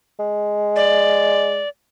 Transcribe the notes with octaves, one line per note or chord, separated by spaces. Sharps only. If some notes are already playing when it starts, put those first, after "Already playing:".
G#3
D5